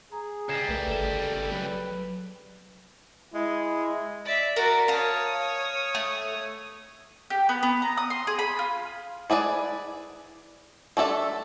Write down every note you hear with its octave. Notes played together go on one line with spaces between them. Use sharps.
G#4 A#5
C#2 G3 G#6 C7 E7
A#1 A3 A#4 B4
G1 G#4 A4 E7
F#3 B4
G#3 E4
D5 E5
F#4 A#4 D5
C#5 F5 A5 D#6
A3
G4
B3
B3
A#5
D#6
C6
G#4
B5
F4
E4 G#4 B4 D5
A3 D4 A4 E5